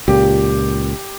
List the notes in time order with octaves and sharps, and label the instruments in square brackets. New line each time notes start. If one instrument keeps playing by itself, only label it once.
[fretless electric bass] C#2 A#2 [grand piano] G4